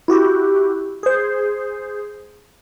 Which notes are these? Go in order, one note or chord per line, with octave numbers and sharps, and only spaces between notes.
E4 F#4 G4
G#4 C5